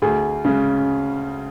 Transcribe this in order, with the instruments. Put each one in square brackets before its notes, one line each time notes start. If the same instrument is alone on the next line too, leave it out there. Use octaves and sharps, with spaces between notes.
[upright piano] D2 G#4
C#3 G#3